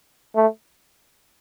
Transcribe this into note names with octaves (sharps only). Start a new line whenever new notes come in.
A3